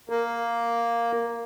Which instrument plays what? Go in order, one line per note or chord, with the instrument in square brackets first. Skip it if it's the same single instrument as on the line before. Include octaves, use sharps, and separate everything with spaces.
[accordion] A#3